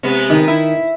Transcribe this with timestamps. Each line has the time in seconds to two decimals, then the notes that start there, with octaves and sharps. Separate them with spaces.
0.03 C3 G#3 B3
0.30 D#3
0.48 E4